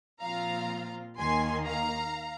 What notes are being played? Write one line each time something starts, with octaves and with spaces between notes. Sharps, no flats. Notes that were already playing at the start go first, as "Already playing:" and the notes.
A#2 F3 C4 F4 F5 A#5
D#2 D#3 A#3 G#5 C6
F5 A#5